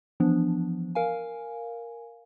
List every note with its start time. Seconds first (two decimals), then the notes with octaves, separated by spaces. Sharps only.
0.20 E3 F3 B3 D4
0.95 A#4 F5 G#5